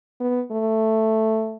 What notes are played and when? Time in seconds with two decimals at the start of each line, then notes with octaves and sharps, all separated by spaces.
0.20 B3
0.52 A3